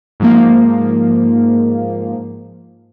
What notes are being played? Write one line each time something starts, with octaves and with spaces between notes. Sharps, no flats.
G#2 F3 A#3